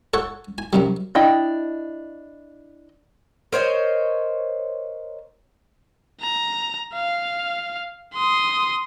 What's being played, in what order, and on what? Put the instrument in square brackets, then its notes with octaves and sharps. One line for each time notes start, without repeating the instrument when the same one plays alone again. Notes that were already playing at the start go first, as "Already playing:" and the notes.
[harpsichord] A4 C#5 F#5
G#5
F#2 C3 G3
[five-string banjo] D4 E4 D#5 G5
[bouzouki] A#4 C5 C#5 D#5
[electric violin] A#5
F5
C6 D#6